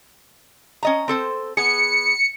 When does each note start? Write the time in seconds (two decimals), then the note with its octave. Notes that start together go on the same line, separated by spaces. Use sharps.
0.83 C#4 D#5 A#5
1.08 C4 A4 C5
1.57 B3 G#4 C#7